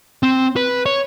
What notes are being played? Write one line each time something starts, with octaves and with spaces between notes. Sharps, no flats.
C4
B4
C#5